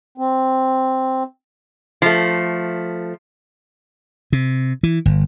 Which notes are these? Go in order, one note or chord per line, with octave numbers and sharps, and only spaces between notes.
C4
F3 A3
C3
E3
G1